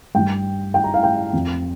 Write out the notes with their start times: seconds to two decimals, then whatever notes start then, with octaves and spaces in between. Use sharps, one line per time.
0.15 G2 G3 G5
0.74 G5
0.84 A#5
0.94 F5
1.03 G5
1.33 F2 F3